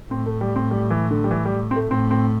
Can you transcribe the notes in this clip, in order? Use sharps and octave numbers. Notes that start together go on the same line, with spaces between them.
A2 C4
A3
G3
C4
G3
E3
D3
G3
E3
G3
C4
A3
A2 C4
C4